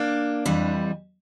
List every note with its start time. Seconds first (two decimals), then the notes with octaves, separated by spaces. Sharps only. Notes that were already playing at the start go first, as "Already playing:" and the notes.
Already playing: A#3 D4
0.45 F2 E3 G3